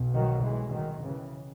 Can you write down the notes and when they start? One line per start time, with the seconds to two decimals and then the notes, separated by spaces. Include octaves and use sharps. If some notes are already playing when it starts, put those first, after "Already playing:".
Already playing: B1 B2
0.14 D#3 F#3
0.43 E3 G#3
0.73 D#3 F#3
1.03 C#3 E3